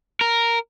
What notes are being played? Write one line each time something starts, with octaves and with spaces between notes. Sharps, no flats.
A#4